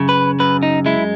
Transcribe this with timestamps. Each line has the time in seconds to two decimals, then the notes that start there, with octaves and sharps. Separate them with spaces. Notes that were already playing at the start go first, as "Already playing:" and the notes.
Already playing: F#2 C#3
0.09 B4
0.39 F#2 B4
0.63 D#4
0.86 G#3 E4